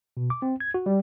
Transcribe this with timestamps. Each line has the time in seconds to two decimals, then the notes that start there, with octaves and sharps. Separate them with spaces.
0.17 B2
0.30 D6
0.42 C4
0.60 G#6
0.74 F#4
0.86 G3